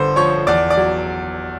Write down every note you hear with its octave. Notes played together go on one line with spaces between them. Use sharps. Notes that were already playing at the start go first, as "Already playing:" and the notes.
Already playing: G1 D3 B4 C5 C6
F3 C#5 C#6
E2 D5 D6
D5 D6
F#3